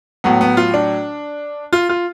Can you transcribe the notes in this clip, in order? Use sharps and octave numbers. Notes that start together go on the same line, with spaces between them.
A2 F#3 B3
B3
F4
D4
F4
F4